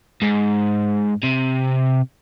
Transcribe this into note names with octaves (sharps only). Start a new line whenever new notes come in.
G#2
C3